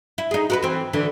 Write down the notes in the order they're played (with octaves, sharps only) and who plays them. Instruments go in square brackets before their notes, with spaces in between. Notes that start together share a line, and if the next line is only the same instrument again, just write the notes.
[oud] E4
D#4 G#4
F#4 A#4 B4
E3 C4
D2 D3 E3